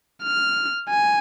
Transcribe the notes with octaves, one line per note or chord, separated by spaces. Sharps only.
F6
G#5